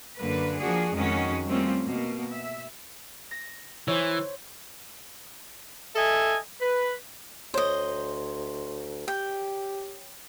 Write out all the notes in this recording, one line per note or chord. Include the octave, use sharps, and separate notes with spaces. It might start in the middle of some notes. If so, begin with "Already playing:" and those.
F#2 D3 A#3 B4
F3 A#3 D4 F#4 G#4
F2 D#3 G#3 C#4 F#4
G3 A3 A#3 C4 C#4 F4
B2 A#3
E5
A#6
E3 C5 C#5
A4 D#5 E5 G#5
B4
D2 C5 C#5 D#5
G4 G5